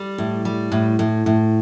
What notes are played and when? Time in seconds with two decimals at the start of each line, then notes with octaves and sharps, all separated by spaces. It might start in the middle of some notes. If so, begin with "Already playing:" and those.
Already playing: G3
0.18 A2
0.45 G3
0.72 A2
0.99 A2
1.26 A2